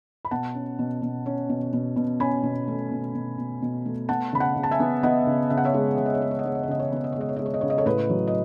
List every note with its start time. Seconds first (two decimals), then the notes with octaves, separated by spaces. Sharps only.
0.25 B5
0.31 B2 F#5 A5
0.55 C#4
0.79 B2
1.02 B2
1.26 C#4
1.50 B2
1.73 B2
1.96 B2
2.20 C#4 G#5 B5
2.43 B2
2.68 A3
2.91 B2
3.15 B2
3.38 B2
3.62 B2
3.85 A3
4.09 B3 F#5 A5
4.33 C#3 B5
4.40 F#5 A5
4.56 C#3
4.63 A5
4.71 E5 G#5
4.80 B3
5.03 B3 D#5 F#5
5.27 C#3
5.50 C#3 E5
5.58 F#5
5.65 C#5 E5
5.74 G#3
5.97 C#3 C#5
6.06 D#5
6.14 C#5
6.21 G#3 D#5
6.31 C#5
6.39 D#5
6.45 G#3 C#5
6.55 D#5
6.63 C#5
6.68 C#3 D#5
6.79 C#5
6.88 D#5
6.92 B3 C#5
7.04 D#5
7.12 C#5
7.16 G#3 D#5
7.29 C#5
7.36 G#3 D#5
7.46 C#5
7.54 D#5
7.61 C#3 C#5
7.70 D#5
7.78 A4 C#5
7.86 A2 B4 D#5
8.09 F#3
8.27 D#5